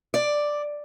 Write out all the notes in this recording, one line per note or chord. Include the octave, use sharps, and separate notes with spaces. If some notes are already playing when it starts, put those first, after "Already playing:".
D5